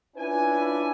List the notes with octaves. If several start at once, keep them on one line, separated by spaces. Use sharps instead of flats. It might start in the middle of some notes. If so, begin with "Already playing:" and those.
C#4 D4 E4 F4 B4 G#5